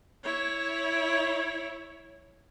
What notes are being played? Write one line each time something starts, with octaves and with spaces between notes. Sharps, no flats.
E4 C#5